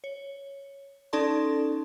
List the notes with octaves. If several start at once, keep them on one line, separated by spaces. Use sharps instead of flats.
C#5
C#4 D#4 A4 D5 A5 C6